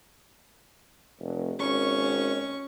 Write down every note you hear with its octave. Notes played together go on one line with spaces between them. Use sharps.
F1
G#1 C#4 C#6